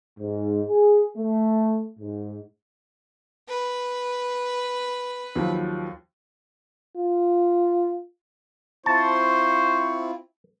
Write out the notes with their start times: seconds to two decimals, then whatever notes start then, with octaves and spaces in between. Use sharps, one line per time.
0.20 G#2
0.69 G#4
1.17 A3
1.99 G#2
3.49 B4
5.36 D#2 F3 F#3
6.96 F4
8.86 C4 E4 F4 C5 A5 C#6